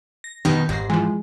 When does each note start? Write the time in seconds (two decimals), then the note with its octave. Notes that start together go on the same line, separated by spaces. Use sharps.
0.24 A#6
0.45 B2 D#3 D#4 G4
0.69 G#1 G#2 A#6 C7
0.90 E3 F3 G#3